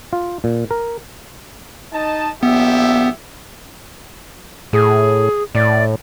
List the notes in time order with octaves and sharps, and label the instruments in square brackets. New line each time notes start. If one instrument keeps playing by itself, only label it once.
[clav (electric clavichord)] F4
A#2
A#4
[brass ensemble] D#4 D#5 A5
[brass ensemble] A#1 G4 E5 [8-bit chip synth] B3
[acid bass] A2 [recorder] G#4
[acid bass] A2 [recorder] D5